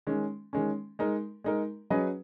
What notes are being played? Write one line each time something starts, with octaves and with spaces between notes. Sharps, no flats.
D#3 G#3 C#4
D#3 G#3 C#4
G#3 D#4 A#4
G#3 D#4 A#4
F#3 C#4 G#4 B4 D#5